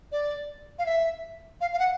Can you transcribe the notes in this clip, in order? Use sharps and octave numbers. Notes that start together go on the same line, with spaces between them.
D5
F5
E5
F5
F5
F#5